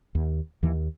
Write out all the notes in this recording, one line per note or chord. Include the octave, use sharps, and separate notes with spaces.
D#2
D#2 E3